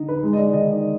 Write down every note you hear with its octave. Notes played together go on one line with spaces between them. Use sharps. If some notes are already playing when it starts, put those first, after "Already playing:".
Already playing: D3 D#4
B4
G#3 D#4
D#5
D5
D#3 D#5
D5